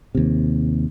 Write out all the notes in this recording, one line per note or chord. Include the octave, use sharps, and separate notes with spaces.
D#2 C3